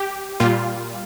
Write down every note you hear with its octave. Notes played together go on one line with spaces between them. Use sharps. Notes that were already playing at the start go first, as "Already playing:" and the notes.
Already playing: G4
A#2 G3 F4